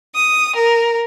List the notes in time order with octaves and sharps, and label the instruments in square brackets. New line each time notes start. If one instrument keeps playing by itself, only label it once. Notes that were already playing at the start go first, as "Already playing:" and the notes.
[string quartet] D#6
A#4